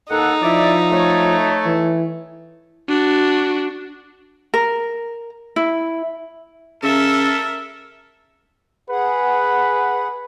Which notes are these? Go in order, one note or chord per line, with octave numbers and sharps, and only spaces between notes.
D#2 D#4 A4 F#5
F3 E4 D5
A3 C#5
E3
D4 F#4
A#4
E4
C#3 A4 A#4 E5
G#4 B4 F#5